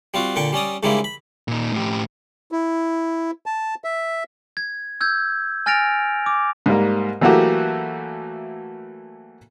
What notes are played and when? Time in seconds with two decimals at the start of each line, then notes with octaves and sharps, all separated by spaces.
0.14 G3 C4 F4 F#4
0.36 A#2 D3 G5 C#6
0.53 G3 C#4 D5 D#6
0.83 G#2 C#3 G3 G#3 A#3 E4
1.04 B5
1.48 A#2 D#4
1.72 A2 G4
2.52 E4
3.46 A5
3.84 E5
4.57 G#6
5.01 E6 G6 G#6
5.66 G#5 F6 A6 A#6 D7 F7
6.26 D6
6.66 G#2 G3 A#3
7.21 E3 F#3 A3 A#3 F#4 G4